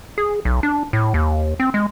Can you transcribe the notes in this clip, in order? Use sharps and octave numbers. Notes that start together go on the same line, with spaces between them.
G#4
B1
D4
A2
D#2
C4
G#3